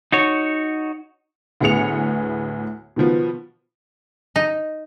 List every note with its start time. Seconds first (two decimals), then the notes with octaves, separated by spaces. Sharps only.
0.12 D#4 F#4 C#5
1.61 D2 A2 B3 G#4 C#7 F7
2.96 B2 D#3 F3 B3
4.36 D#4